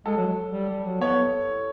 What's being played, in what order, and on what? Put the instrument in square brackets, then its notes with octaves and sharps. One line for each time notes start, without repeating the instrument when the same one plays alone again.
[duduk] G#3 [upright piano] A4
[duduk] F#3
F#3
G3
G3
F#3
[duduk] B3 [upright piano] C#5